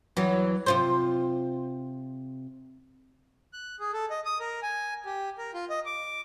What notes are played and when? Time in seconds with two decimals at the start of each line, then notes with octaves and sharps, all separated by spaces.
0.17 E2 E3 F#3
0.66 C3 F4 C5
3.53 F#6
3.80 G#4
3.93 A4
4.10 D#5
4.25 D#6
4.40 A#4
4.62 G#5
5.06 G4
5.38 A#4
5.54 F4
5.70 D#5
5.86 D6